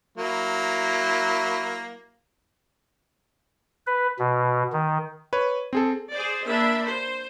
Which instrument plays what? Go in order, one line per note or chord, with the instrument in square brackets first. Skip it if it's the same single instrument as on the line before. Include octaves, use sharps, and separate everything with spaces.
[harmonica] F#3 A#3 E4
[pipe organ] B4
B2
D#3
[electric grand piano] B4 C#5
C4 G#4 A4
[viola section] G#4 C5 D5
A#3 D4 E5 B5
C5